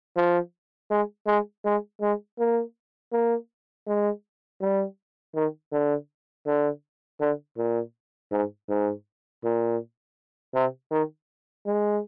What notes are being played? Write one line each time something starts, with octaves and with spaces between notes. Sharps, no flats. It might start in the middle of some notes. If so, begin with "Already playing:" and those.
F3
G#3
G#3
G#3
G#3
A#3
A#3
G#3
G3
D#3
D3
D3
D3
A#2
G#2
G#2
A#2
C3
D#3
G#3